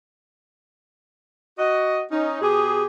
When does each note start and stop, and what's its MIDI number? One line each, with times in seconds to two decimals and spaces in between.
1.59 2.02 66
1.59 2.02 75
2.11 2.40 61
2.11 2.40 63
2.41 2.86 47
2.41 2.86 67
2.41 2.86 68